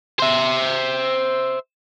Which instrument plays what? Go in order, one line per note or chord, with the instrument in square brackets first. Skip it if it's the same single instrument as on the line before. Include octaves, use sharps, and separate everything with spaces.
[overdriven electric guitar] C5 E5